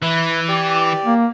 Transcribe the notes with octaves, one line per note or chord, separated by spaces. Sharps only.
E3 E4 F#6
G4 D5
A#3